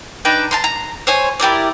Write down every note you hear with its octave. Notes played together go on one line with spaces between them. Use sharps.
D4 D#4 B4 G5
A5 A#5 C6
A#5
C5 C#5 G#5
E4 G4 A#4 D5